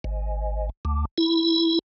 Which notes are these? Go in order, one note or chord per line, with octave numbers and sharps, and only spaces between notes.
G#1
D2
E4